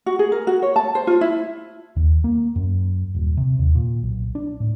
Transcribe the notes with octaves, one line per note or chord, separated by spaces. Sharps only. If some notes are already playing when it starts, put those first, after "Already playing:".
F#4
G#4
A#4
F#4
C#5
A5
C5
F4
E4
D#2
A#3
F#2
D#1
C3
D#2
A#2
B1
D4
A2